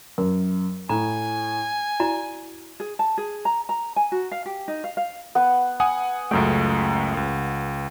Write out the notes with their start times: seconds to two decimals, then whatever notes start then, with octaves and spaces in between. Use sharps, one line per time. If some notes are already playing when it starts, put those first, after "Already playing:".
0.18 F#2 A#4
0.89 A2 G#5 A#5
2.00 E4 F#4 D5 A#5
2.80 G#4
2.99 A5
3.18 G#4
3.45 A#5
3.69 A#5
3.96 G#5
4.12 F#4
4.31 F5
4.46 G4
4.68 D#4
4.84 F5
4.97 F5
5.35 B3
5.80 F#5 G#5 D#6
6.31 C#2 F#2 A3 G5
7.17 C#2